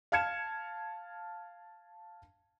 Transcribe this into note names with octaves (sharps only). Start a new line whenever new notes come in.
F5 A5 F6 G#6 C#7 E7